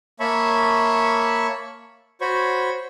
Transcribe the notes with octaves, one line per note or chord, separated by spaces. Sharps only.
A#3 C#5 E5 A5 B5 C#6
F#4 C5 C#5 B5 C#6